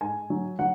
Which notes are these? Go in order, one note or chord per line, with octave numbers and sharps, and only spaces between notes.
G#2 G#5
F#3
F#3 F#5